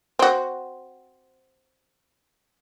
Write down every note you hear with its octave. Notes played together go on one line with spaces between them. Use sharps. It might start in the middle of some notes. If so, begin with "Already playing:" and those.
C4 F#4